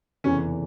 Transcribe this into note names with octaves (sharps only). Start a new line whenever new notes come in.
F1 E2 C#3 E3 C#4